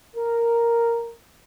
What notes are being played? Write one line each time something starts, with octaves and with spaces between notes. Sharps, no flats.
A#4